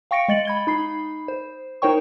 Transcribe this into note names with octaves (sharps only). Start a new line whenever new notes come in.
F5 G5 C#6 A#6 C#7 D7
G#3 D#5 A6 C#7 F#7
B5 G#6 G7
D#4 B5 C7
C5
D#4 A#4 C5 C#5 G5 C#6